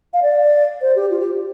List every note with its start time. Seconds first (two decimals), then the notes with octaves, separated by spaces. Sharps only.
0.14 F5
0.22 D5
0.81 C5
0.96 G4
1.10 F4
1.20 G4